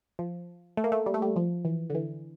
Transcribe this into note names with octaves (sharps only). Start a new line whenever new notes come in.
F3
A3
A#3
A3
G3
A3
G3
F3
E3
D3
E3